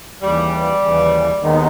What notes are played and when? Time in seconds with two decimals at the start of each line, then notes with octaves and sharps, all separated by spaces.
0.22 D#2 C#3 E3 G3
0.81 D#2 C#3 E3
1.41 D#2 D#3 G#3 B3 D#4